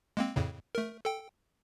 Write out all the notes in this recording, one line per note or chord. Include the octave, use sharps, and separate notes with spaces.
G#3 A#3 C4
F2 A2 C#3
A3 A#4
A4 G5